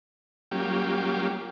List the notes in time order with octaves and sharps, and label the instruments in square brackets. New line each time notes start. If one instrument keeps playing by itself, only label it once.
[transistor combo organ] F#3 G3 A#3 C#4 F4 G4